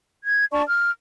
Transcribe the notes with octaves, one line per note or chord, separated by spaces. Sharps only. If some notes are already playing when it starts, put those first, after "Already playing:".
G#6
D4 D5 A5 C#6
F6